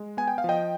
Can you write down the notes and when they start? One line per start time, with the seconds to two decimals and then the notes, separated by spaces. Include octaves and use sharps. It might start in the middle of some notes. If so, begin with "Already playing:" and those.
Already playing: G#3
0.17 B3 G#5
0.28 G5
0.38 F5
0.44 F3 D#5 G5